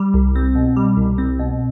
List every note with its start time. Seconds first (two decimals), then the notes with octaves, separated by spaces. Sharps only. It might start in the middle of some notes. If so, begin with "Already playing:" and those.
Already playing: G3
0.14 C2
0.36 C4
0.55 B2
0.76 G3
0.97 C2
1.18 C4
1.39 B2